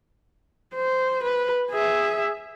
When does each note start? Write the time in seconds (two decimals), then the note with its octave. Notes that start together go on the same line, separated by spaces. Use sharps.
0.75 C5
1.23 B4
1.70 G#4 E5